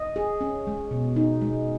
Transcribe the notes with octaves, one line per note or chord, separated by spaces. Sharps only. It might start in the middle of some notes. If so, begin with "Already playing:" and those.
Already playing: D#5
G#4
C#4
G#3
B2
D#4
G#3